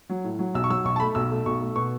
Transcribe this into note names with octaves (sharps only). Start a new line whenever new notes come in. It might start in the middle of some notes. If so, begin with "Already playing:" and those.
F#3
A2
F#3
B1 E6
C#6
F#3 E6
B1 C#6
A5
A3 B5
B1 E6
A3
B1 C#6
A3
B2 C#6